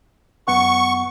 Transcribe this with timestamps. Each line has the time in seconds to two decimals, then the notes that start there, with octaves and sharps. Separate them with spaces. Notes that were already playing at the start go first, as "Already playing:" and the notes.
0.48 F#2 B3 F#5 C#6